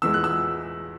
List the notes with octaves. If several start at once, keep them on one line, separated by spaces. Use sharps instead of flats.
E2 E3 G#3 E6
F#6
E6